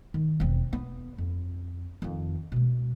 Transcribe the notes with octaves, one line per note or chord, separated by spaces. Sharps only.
D#3
E1 C4
B3
F2
F2 D#3
B2 G#3